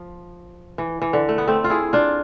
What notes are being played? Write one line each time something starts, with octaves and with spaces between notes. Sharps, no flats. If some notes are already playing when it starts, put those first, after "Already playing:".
Already playing: F3
E3
E3
D3
A3
B3
A3 C4
F4
E4 G#4
D4 F4